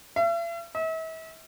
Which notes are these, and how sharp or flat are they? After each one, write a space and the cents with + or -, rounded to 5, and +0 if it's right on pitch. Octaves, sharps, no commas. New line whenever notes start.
E5 +45
E5 -40